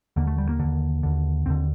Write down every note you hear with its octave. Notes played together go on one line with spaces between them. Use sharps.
D#2 D3 A#3
A3
G3
A#3
D#2 D3
D#2 D3
D#2 D3 C4